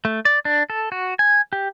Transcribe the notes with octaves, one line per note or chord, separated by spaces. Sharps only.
A3
D5
D4
A4
F#4
G#5
G4